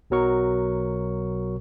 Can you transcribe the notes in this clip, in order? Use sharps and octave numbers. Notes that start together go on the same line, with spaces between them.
B1 B2 F#3 A#4 C#6